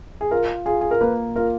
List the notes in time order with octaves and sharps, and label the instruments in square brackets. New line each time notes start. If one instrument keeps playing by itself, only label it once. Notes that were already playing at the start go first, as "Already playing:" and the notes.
[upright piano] G#4
[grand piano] F4 [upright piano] A#4
[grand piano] F4 [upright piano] G#4
[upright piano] G#4
A#4
[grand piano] A#3 [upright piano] B4
[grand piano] F4 [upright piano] A#4